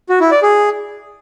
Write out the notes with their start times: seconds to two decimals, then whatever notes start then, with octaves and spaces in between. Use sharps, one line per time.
0.09 F#4
0.20 E4
0.31 D5
0.43 G#4